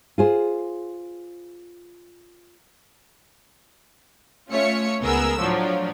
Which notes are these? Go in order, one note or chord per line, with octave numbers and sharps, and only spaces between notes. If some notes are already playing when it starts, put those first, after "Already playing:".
F4 G#4 C5
A3 C#4 F4 C#5 E5 C#7
C#2 B3 G#4 A#4 E6
A2 F3 F#3 D4